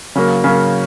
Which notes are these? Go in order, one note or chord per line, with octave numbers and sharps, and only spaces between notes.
C#3 F#3 A#3
C#3 F#3 A#3